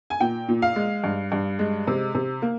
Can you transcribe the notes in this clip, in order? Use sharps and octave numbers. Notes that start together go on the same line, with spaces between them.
G#5
A#2 G5
A#2
F5
G#3
G2
G2
G#3
C3
C3
A#3